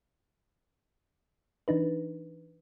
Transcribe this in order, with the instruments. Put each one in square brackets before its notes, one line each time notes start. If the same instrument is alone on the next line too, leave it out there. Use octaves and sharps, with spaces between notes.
[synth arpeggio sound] E3 D4 D#4 B4